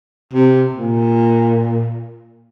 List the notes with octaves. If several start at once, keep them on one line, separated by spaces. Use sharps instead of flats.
C3
A#2